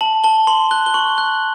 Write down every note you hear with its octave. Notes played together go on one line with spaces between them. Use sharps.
A5 F#7
A5 G7
C6 F#7
F#6 G7
G7
C#6 F#7
F#6 F#7